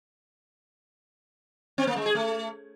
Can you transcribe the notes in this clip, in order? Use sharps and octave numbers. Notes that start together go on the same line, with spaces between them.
C4
A#3
G#3
G#4
A3